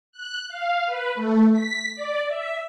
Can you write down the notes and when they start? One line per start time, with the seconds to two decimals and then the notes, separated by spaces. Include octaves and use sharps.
0.12 F#6
0.48 F5
0.86 B4
1.15 A3
1.51 B6
1.95 D5
2.28 E5